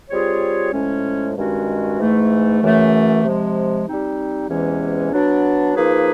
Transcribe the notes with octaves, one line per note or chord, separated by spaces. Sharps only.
G3 C4 F4 G#4 C#5
A2 F3 G#3 C#4
G2 D#3 G#3 C#4 F#4
G#2 E3 A3
F#2 C#3 E3 A3
C3 F3 G#3
G3 C4 D#4
E2 C3 E3 G#3 C#4
F#3 B3 D4
F3 A#3 D#4 G#4 B4